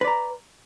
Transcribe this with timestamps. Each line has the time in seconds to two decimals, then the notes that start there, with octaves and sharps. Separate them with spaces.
0.01 B4
0.04 D5
0.07 A#5